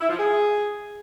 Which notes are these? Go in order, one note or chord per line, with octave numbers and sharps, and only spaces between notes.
E4
F3
G#4